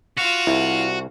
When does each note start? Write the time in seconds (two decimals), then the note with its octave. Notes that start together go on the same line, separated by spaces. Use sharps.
0.17 F4 F#4 F5
0.47 C2 E4